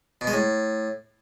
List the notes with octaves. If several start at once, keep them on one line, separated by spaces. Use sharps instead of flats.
B2
G#3
A2